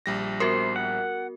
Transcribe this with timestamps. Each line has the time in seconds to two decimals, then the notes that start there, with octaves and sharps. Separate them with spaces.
0.06 A#1 G3 A#6
0.40 B3 F#4 A#4 C5
0.76 F#5